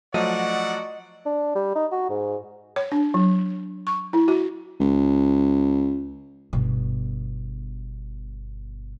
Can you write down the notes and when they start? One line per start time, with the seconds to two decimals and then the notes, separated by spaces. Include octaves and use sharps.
0.14 F3 F#3 A3 F#4 D5 D#5 F#5
1.26 D4
1.55 G3
1.75 D#4
1.92 F#4
2.10 G#2
2.76 C#5
2.92 D4
3.14 F#3
3.87 C#6
4.13 E4
4.28 F#4
4.80 C#2
6.53 G1 B2